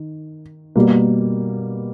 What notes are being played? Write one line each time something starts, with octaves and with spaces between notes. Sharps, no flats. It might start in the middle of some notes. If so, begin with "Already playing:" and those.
Already playing: D#3
B2 G3 A#3